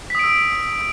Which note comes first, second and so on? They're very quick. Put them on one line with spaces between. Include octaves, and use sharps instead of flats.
B6 D#6 D7 E6